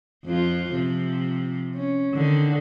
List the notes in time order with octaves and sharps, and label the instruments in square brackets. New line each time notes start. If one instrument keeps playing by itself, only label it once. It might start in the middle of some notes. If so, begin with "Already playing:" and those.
[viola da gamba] F2 F3 F4
C3 F3
C#4
D3 D#3